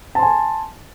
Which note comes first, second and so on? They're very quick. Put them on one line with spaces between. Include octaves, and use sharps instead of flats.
A5 C6 G#5